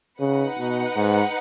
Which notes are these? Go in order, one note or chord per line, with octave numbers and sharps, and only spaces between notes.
C#3 D#4 B4 F#5
B2
G#2